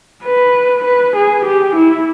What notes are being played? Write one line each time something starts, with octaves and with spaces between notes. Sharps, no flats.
B4
B4
G#4
G4
E4